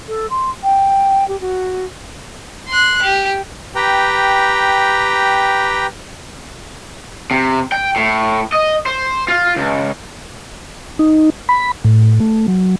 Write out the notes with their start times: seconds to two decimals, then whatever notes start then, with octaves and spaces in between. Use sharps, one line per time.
0.08 A4
0.30 C6
0.63 G5
1.28 G4
1.40 F#4
2.68 C6 F#6
3.02 G4
3.75 G4 B4 G5 A#5
7.31 C3
7.72 G5
7.96 A2
8.52 D#5
8.86 C5
9.28 F4
9.57 C#2
10.99 D#4
11.49 B5
11.84 A2
12.20 A3
12.48 F#3